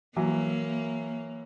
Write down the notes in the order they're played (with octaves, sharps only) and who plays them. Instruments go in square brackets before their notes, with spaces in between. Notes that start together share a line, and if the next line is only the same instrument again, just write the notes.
[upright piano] E3 F#3 [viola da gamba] A#3